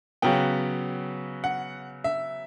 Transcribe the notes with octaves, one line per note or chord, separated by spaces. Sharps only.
C#3 F#3 B3 G5
F#5
E5